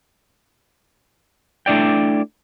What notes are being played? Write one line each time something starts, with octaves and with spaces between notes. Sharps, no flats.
A3 D4 E4 D5 G5